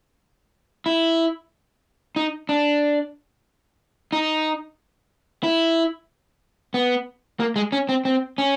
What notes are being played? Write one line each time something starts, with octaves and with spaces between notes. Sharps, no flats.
E4
D#4
D4
D#4
E4
B3
A#3
G#3
C#4
C4
C4
C#4